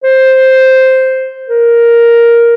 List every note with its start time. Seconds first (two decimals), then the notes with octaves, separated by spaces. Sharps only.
0.04 C5
1.49 A#4